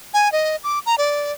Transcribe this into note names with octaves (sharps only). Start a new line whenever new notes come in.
G#5
D#5
D6
A#5
D5